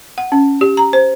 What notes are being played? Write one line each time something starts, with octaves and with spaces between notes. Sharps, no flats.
F#5
C#4
G4
A#5
C5